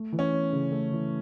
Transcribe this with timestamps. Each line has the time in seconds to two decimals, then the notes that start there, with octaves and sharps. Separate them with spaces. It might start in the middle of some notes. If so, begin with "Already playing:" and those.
Already playing: A3
0.12 E3
0.19 C#4
0.33 C#4
0.53 C#3
0.72 A3
0.92 E3